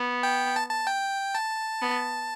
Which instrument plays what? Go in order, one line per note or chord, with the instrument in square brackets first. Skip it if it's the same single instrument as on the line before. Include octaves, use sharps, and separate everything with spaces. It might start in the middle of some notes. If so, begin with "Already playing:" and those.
Already playing: [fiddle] B3
[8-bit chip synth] G5
A5
A5
G5
A5
[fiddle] B3